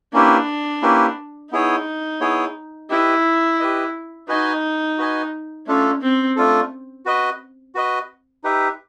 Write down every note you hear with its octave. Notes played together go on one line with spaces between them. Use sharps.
A#3 C#4 D4 E4 G4 B4
A#3 C#4 E4 G4 B4
B3 D#4 E4 G#4 C#5
B3 E4 G#4 C#5
E4 G4 B4 D#5
G4 B4 D#5
D#4 F#4 B4 D#5 G#5
F#4 B4 D#5 G#5
A3 C#4 D4 F4 A4
C4
A3 D4 F4 A4
F#4 B4 D#5
F#4 B4 D#5
D#4 G4 B4 E5